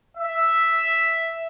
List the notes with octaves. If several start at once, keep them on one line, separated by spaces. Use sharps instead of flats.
E5